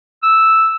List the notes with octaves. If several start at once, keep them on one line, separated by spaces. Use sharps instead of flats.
E6